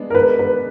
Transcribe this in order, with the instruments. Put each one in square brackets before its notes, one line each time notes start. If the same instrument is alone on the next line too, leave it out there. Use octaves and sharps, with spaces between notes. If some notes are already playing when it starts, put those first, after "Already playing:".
Already playing: [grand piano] G#3 B3 D4
[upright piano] A#4
[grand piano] G#3 [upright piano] B4
[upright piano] B4
[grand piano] G#3